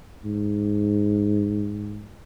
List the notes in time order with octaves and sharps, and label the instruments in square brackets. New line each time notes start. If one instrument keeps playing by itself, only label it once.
[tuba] G#2